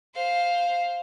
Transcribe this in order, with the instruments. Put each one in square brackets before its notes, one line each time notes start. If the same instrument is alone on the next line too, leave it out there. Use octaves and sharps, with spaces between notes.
[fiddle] C5 F5